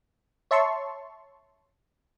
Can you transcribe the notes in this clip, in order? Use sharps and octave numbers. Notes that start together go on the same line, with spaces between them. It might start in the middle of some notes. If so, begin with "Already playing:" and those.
C#5 E5 A5 C6 C#6